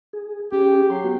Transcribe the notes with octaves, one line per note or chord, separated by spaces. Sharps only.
G#4
C#4 G4 G#4
F#3 C6
B3 F#4 G4